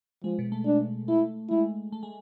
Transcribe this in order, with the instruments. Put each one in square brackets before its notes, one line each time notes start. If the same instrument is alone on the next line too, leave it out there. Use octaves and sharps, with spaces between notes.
[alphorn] F3 [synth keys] G#3
[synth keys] B2
A3
[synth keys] G#3 [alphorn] D4
[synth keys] A3 [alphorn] E4
[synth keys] G#3 [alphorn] E4
[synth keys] A3
G#3